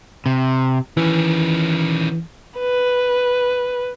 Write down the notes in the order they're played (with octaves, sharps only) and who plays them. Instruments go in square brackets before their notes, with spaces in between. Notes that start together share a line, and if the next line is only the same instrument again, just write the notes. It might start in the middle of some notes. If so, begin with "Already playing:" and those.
[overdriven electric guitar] C3
[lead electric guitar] D#3 C#4 [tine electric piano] E3
[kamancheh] B4